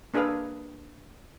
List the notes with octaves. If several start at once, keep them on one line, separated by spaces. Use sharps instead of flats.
A#3 D4 G#4 A4 B4 F5